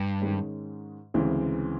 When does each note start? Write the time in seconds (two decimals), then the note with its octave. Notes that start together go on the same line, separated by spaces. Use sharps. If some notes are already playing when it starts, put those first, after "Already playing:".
Already playing: G2
0.20 G#2 D#3 G#3 C#4
1.14 D2 C#3 E3 G#3 C4